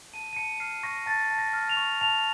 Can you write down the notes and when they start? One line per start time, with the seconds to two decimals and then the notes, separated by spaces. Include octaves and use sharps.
0.14 A5 D#7
0.33 D#7
0.36 A5 C#7
0.60 F6 C7
0.83 C#6 A#6
1.06 A5 A6
1.30 A5
1.39 A#6
1.53 F6
1.69 F7
1.77 C#6
2.01 A5 F7